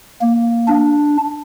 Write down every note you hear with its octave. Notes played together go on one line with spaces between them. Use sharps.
A#3
D4